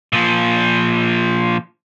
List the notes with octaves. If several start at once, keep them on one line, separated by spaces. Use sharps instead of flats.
A#2 F3